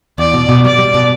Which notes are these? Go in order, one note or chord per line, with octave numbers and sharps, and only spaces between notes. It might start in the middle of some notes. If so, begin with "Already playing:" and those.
E2 D5
B2
B2
G3 D5
G3
B2